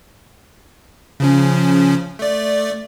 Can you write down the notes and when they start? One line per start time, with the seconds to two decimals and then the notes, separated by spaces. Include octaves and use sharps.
1.20 C#3 F3 C#4
2.19 A3 D5